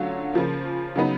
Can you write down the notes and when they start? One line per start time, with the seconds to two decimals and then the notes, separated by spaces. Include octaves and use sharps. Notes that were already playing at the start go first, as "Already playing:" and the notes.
Already playing: D3 F#3 A3 C#4 F4
0.33 C#3 F3 A#3
0.96 C#3 F#3 B3 D#4